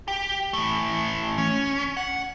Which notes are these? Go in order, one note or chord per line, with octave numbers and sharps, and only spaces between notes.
G4
E3 A3
C#4
F#5